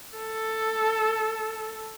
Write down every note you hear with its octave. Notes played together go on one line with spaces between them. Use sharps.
A4